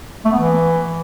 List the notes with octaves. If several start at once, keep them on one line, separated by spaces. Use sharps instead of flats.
A3
B3
E3